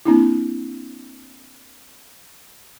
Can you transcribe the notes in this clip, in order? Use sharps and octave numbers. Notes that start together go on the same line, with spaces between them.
A#3 C4 D4 E4